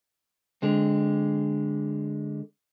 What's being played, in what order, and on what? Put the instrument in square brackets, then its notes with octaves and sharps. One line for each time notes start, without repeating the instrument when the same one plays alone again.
[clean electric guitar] D3 G#3 C4